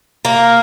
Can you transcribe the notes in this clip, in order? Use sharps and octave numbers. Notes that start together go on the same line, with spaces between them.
A#3